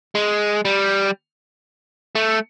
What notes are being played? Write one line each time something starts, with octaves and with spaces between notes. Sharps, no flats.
G#3
G3
A3